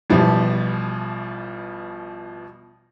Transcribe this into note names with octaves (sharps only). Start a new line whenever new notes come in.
A1 B2 E3 F3 G3